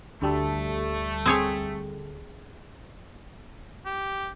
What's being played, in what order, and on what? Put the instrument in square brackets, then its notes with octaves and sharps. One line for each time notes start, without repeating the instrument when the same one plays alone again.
[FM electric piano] D2 G3 A4 [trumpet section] A3
[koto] C4 G#4 C#5
[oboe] G4